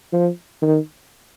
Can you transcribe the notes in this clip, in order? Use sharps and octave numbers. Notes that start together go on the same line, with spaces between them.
F3
D#3